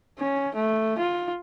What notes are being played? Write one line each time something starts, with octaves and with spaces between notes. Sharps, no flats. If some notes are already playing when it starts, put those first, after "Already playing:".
C#4
A3
F4